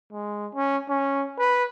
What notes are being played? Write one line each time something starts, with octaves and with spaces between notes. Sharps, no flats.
G#3
C#4
C#4
B4